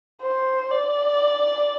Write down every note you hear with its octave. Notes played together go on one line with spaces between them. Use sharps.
C5
D5